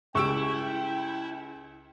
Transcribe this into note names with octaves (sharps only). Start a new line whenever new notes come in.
C#2 E4 G4 G5 C#6 E6 D7